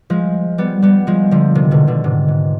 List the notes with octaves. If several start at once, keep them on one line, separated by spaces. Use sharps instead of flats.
F3 G#3
G3 B3
G3 B3
F3 G#3
D3 F3
C3 D#3
B2 D3
B2 D3
G#2 C3
G#2